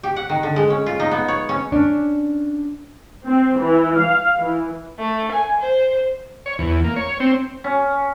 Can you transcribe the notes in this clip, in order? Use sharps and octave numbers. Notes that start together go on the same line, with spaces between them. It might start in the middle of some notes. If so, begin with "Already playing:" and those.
G4
F#5
D#3
D3
G#3
C#4
F4
D#4
B3
C#5
C#4
C#4 D4
C4
E3
F5
E3
A3
G#5
C5
C#5
E2
A#3
C#5
C4
C#4